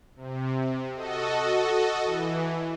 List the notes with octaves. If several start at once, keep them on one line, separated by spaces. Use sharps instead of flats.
C3
F#4 A4 D#5
E3